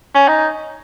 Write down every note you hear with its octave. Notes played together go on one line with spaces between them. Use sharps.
C#4
D#4